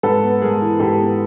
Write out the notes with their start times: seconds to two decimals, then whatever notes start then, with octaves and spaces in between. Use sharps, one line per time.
0.03 G#2 A4 B4
0.23 B3
0.42 G#3 G#4 A#4
0.62 E3
0.80 G#2 G4 A4
0.99 B3